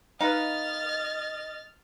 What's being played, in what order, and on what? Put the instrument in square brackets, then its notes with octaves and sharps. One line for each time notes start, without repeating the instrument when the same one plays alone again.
[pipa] D#4 B4 [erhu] D#5 [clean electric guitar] F5 [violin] F6 A6